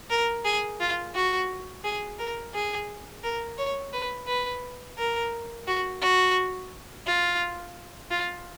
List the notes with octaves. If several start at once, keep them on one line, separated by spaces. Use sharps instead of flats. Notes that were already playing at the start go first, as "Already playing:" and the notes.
A#4
G#4
F4
F#4
G#4
A#4
G#4
A#4
C#5
B4
B4
A#4
F#4
F#4
F4
F4